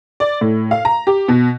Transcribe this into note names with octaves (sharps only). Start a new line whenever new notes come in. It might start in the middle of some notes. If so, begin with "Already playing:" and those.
D5
A2
F5
A#5
G4
B2